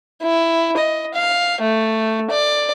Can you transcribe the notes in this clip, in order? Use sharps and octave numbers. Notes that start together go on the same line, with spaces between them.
E4
D#5
F5
A3
D5